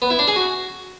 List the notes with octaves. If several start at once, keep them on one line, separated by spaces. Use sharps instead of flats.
B3
E4
D4
G#4
F#4